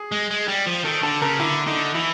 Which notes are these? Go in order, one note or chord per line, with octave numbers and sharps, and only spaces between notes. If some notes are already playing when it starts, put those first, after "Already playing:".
Already playing: G#4
G#3
G#3
G3
F3
D#3 A4
D3 A4
C#3 A#4
D3 E4
D3 D#4
E3 E4